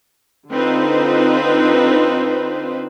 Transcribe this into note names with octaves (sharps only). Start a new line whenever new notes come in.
D3 C4 D#4 F4 B4 C5